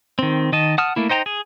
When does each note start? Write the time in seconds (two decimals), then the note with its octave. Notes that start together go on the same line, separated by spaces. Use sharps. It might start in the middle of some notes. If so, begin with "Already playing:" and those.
0.19 D#3 C4
0.52 D#3 D#5 A5
0.78 F#5 A5 D#6 F6
0.96 A3 A#3 E4
1.09 D#4 C5 G5 A5 A#5
1.26 G#4